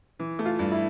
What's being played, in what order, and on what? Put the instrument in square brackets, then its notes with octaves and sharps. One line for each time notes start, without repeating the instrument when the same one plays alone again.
[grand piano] E3
A3
[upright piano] F4
[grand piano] G2
[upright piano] E4